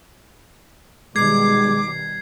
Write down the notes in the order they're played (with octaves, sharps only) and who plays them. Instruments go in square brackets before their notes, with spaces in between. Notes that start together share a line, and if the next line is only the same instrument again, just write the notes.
[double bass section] B2 D#3 G3 [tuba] G#3 [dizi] D6 [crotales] G#6 C7